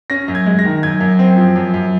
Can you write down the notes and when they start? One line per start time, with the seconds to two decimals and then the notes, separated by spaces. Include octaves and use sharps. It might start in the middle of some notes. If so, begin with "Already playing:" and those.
0.10 C#4 A#6
0.28 F#2
0.35 G#6
0.46 G#3
0.59 A#6
0.65 D#3
0.83 F#2 G#6
1.01 F#2
1.19 C4
1.37 F3
1.56 F#2
1.74 F#2